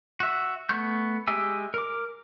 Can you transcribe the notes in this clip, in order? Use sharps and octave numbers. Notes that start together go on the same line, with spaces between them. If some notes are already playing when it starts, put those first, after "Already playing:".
F#4 E5
A3 B3 C#6 G6
G#3 G4 E5 G#5 E6
A#4 D6